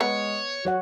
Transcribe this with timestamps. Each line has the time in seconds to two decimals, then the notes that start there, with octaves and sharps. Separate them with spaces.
0.01 G#3 B3 C#5
0.65 F#3 F#4 C#5 F#5